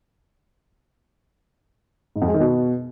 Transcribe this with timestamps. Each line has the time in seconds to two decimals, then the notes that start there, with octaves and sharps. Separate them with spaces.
2.16 G#2
2.22 F2
2.28 G#3
2.34 D#3
2.40 B2